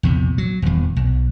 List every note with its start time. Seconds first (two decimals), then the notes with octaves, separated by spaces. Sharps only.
0.03 A#1 E2 C3
0.38 F#3
0.62 D#1 E2
0.96 B1